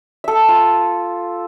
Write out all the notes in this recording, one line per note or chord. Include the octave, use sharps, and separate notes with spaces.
A4 E5
F4